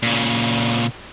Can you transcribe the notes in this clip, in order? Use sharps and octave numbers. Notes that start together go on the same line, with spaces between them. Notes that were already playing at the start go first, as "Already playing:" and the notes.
A#2 C#3